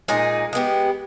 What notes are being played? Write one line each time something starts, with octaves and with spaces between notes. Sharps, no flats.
A#2 G#3 D#4 G#4
G#3 B3 G4